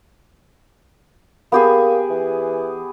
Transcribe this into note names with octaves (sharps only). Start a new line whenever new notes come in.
A#3 B3 G4 G#4
E3